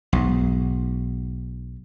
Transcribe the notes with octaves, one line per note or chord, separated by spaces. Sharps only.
B1 G#2